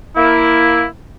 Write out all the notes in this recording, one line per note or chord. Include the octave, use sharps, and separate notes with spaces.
A#3 E4